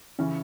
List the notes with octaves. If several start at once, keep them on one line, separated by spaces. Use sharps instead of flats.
C#3 E3 C#4